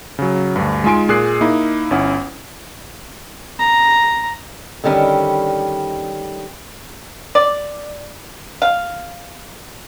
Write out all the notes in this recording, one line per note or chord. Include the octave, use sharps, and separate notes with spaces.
C#3 F#3
D2 G2
G#3 D#4 F4 G#5 C6 D7
A#2 G#4 D#6 F#6 C7
A#3 D#4 E4
G1 C#4 E4 F#5
A#5
D3 D#3 G3 C#4
D5
F5